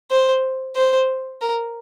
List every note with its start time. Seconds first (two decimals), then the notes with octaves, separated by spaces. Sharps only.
0.11 C5
0.76 C5
1.41 A#4